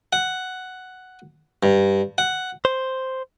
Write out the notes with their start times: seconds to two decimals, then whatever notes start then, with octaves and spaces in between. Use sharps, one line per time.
0.13 F#5
1.63 G2
2.18 F#5
2.65 C5